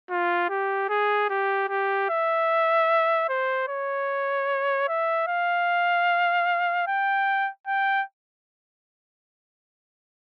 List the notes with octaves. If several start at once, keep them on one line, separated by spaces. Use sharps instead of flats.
F4
G4
G#4
G4
G4
E5
C5
C#5
E5
F5
G5
G5